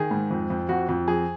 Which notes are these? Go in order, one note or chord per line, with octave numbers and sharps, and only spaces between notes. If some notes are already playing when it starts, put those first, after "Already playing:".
Already playing: D#3 G#4
G#2
F2
F2
F2 F#4
F2
F3 G#4